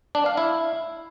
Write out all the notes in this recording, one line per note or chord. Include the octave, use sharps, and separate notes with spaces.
D4
F5
E4